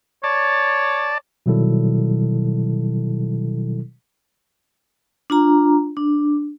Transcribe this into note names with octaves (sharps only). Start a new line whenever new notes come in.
C#5 D5 A5
B2 D#3 F#3 G3 E4 A4
D4 F4 A#5
D4